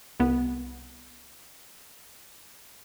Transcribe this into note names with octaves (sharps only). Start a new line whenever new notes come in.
C2 B3